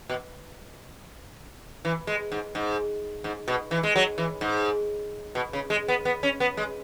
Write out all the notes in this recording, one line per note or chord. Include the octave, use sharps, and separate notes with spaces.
B2
E3
G#3
G#2
G#2
G#2
B2
E3
G#3
F#3
E3
G#2
B2
C#3
G#3
B3
B3
C#4
B3
G#3